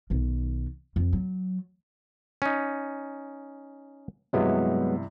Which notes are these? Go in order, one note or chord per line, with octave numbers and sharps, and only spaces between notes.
B1 D#3
F2
F#3
C#4 D#4
G2 C3 E3 F#3 G#3 B3